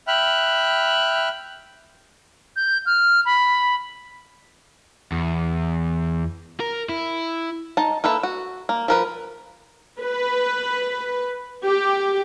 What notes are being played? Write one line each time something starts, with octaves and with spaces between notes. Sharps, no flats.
E5 G5 B5 F6 F#6
G6
F6
B5
E2
A#4
E4
D#4 A5
A#3 A4 B4 E5
F#4
A#3
F3 A#4 B4
B4
G4